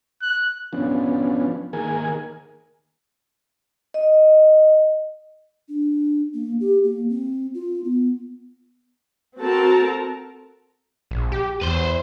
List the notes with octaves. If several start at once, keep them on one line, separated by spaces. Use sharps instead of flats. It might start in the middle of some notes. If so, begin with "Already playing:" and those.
F#6
F3 B3 C#4 D4
D#3 A#3 G#4 A#4 G#5
D#5
D4
A#3
G4
A#3
C4
F4
B3
C4 F#4 A4 A#4 A5
A#1
G4
E2 B4 C5